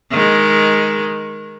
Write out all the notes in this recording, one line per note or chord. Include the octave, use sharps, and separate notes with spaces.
D#3 G#3